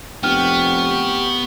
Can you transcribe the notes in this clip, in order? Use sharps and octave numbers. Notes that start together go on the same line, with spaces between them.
F1 B3 G4 G5 C#6 F6